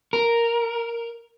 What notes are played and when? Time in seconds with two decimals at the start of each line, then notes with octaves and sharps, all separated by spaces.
0.13 A#4